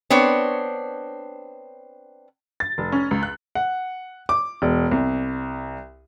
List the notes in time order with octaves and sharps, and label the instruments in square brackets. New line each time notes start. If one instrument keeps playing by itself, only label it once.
[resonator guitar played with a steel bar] B3 C4 D4 C#5
[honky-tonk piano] A6
F1
C#4
C#2
F#6
[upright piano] F#5
D6
E1
C2